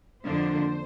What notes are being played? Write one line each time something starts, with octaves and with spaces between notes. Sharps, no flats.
F2 D3 F3 A#3 D4 C5